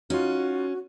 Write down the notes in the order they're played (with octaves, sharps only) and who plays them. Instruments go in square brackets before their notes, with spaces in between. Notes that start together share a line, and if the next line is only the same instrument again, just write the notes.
[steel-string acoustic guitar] C#4 [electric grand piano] D#4 F4 [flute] F#4